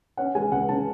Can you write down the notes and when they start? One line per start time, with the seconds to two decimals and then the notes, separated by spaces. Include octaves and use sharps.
0.17 C#4 F#5
0.35 G#3 G#5
0.52 C#2 F#5
0.69 C#3 A5